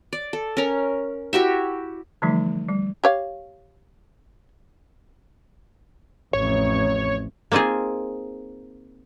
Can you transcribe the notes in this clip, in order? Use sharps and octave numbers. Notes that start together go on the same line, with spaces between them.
D5
A4
C#4 A#4
E4 F#4 G4 E5
D3 E3 F3 G3 A3 D#4
G3
G4 C#5 F5
A1 F2 C#5
A#3 C4 D#4 F4 G#4